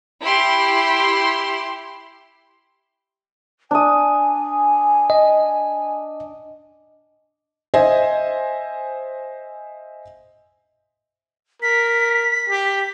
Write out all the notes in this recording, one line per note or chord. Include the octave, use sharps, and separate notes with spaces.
E4 G4 C6
D4 G#5 D#6
D#5
C5 D#5 E5 G#5
A#4 B6
G4